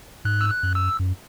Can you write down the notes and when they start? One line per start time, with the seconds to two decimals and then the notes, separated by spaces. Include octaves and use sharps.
0.25 G#2 F#6
0.41 E6
0.50 F#6
0.63 F#2
0.75 E6
0.99 F#2